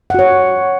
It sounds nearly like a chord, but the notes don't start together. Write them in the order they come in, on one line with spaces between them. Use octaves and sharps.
F#5 F#4 C#5